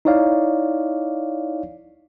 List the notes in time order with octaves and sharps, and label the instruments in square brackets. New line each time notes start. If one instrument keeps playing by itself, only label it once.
[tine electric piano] D#4 E4 C#5 D5 F5